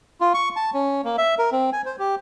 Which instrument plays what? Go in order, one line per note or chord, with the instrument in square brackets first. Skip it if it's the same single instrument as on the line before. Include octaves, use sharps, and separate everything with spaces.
[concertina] F4
C#6
A5
C#4
A#3
E5
A#4
C4
G#5
C5
G4